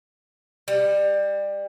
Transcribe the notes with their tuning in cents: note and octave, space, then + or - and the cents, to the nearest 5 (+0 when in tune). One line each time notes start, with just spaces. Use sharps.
G3 +25